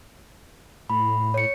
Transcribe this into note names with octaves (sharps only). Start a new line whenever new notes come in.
A2 B5
C#5 C#7